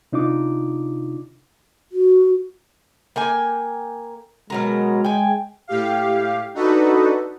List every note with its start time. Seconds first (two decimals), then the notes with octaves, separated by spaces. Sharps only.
0.12 C3 D4 D#4 F4 D6
1.92 F#4
3.16 A#3 G5 G#5
4.50 B2 F#3 G#3 A#4
5.05 G5 G#5
5.68 A2 G4 F5
6.54 D4 D#4 F#4 A4 B4